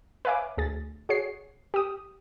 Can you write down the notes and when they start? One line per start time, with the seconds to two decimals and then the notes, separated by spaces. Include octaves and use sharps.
0.25 B4 C#5 E5 F5 G#5 D6
0.58 D2 G#4 A6
1.09 F#4 G#4 C#5 C7
1.74 G4 D#6